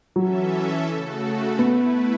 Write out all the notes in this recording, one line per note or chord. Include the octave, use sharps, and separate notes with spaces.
E3 F#3 C#4 A4 E5
C#3 A3 F#4 A4
A3 B3 E4 B4